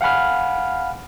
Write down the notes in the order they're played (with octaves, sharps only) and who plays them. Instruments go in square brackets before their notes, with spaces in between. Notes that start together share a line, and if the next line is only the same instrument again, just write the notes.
[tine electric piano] F5 F#5 G#5 B5 F6